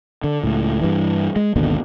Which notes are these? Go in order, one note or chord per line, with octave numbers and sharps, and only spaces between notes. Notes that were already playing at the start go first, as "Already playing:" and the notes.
D3
C#2 A2
G2 E3
G#3
G#1 D#2 B2 D3